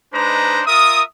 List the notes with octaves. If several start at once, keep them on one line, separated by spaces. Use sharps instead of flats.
G#3 D4 D#4 B4 C5 A#5
F4 A#4 E5 D#6